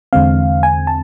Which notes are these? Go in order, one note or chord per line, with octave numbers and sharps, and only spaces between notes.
E2 D3 G#3 C4 F5
G#5
A5